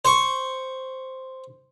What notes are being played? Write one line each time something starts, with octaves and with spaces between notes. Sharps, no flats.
C5 C#6